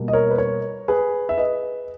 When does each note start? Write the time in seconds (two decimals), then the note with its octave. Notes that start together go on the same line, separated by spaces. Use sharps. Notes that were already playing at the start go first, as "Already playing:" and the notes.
Already playing: B2 G3 A#3
0.08 D#5
0.13 A#4 C#5
0.31 B4
0.38 A#4 C#5
0.88 G#4 B4
1.29 E5
1.38 B4 D#5